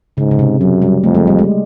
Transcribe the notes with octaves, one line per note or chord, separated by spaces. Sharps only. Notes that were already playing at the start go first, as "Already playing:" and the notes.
G#2 C#3
C#3
C3
F#2 F#3
G3
F2 A3
G#3
G3
G#3